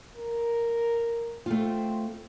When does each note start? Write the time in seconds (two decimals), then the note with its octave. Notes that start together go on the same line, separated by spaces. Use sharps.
0.16 A#4
1.46 A3 C4 F4